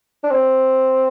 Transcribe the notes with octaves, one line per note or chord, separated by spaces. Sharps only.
D4
C4